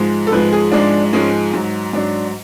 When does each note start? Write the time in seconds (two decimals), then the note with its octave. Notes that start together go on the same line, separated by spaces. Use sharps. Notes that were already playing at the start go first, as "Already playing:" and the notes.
Already playing: G#2 F3 G#3
0.27 A4
0.32 G#2 F3 G#3 B4
0.53 G#4
0.72 G#2 F3 G#3 D4
1.13 G#2 F3 G#3 C#4
1.54 G#2 F#3
1.93 G#2 F#3 D4